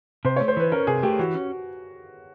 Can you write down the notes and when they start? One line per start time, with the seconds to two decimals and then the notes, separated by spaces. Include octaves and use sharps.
0.25 C3 C5
0.36 A3 C#5
0.48 C5
0.57 E3 B4
0.72 C#4 A#4
0.87 C3 G#4
1.03 A3 G4
1.19 E3 F#4
1.34 C#4